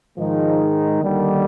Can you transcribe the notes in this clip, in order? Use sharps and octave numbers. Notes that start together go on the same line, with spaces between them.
G#2 D#3 F3 G#3 D#4
D#2 D3 D#3 G3